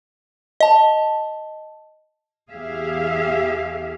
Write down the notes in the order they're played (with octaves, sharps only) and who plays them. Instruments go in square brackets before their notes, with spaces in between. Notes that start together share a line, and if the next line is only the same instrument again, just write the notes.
[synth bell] D#5 A5
[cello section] E2 G4 G#4 E5 F5